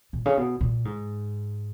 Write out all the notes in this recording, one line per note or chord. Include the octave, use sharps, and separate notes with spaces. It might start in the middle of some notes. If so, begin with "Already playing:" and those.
A#2
C#3
B2
A#2
G#2